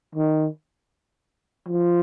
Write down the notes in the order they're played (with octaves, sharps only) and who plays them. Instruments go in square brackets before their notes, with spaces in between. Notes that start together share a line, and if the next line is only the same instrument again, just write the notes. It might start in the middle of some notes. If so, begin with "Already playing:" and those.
[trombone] D#3
F3